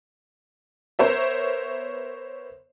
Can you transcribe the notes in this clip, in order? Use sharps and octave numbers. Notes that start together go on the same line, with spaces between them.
B3 A#4 C5 C#5 E5